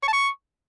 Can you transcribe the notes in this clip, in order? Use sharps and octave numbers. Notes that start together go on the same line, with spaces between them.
C#6
A5
C#6